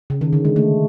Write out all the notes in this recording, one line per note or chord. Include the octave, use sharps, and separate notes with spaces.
C#3
D#3
D3
G#3
A3